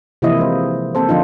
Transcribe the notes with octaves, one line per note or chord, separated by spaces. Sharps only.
C3 E3 F3 A#3 E4 D#5
G#3 C5
A#3 C4 A4 C5
D3 F3 D4 D#4 F4